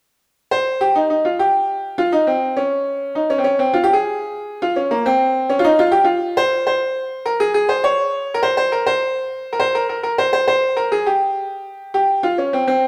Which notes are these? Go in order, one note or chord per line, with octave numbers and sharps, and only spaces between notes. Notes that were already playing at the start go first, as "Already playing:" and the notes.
C5
G4
D#4
D#4
F4
G4
F4
D#4
C4
C#4
D#4
C#4
C4
C#4
C4
F4
G4
G#4
F4
C#4
A#3
C4
C#4
F4
D#4
F4
G4
F4
C5
C5
A#4
G#4
G#4
C5
C#5
A#4
C5
C5
A#4
C5
A#4
C5
A#4
A#4
A#4
C5
C5
C5
A#4
G#4
G4
G4
F4
C#4
C4
C4